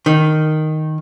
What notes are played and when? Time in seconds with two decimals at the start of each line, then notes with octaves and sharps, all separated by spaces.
0.06 D#3